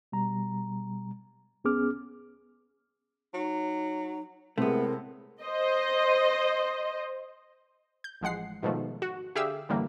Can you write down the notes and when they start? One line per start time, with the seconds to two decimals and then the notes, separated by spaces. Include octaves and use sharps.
0.12 B2 G3 A#5
1.64 C2 B3 C#4 G#4 D6 F6
3.34 F#3 D#4
4.58 A2 C3 G#3 A3 B3 A#4
5.42 C5 D#5
8.04 G6
8.21 A1 F3 G#3 F#5 C7
8.63 G#2 B2 D#3 F3 A3
9.02 F#4
9.35 D3 G4 G#4 E5 F5 E6
9.69 F#2 A2 D3 E3 G3 A#3